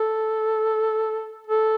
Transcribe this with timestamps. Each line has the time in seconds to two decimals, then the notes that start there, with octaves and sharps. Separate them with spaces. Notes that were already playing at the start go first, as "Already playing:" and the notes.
Already playing: A4
1.47 A4